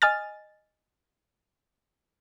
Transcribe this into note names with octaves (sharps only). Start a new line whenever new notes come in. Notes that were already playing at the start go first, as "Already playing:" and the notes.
D#5 G#5 F6 A6